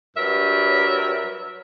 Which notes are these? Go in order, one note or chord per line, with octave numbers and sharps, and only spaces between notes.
G2 F#3 A#4 E5